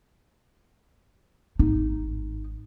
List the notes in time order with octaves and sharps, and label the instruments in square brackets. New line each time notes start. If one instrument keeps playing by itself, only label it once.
[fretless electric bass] G#1 [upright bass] D#4